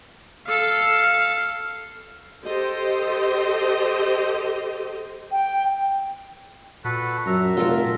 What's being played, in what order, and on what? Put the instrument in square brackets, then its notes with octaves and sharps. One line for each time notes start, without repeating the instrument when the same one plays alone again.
[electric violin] A4 F5
[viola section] G4 A4 C5 D#5
[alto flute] G5
[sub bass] A#2 [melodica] F#4 A4 B4
[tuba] F#2 [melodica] E5 A#5
[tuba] F1 [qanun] F4 A4 A#4